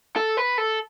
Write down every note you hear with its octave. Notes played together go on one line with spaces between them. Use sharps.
A4
B4
A4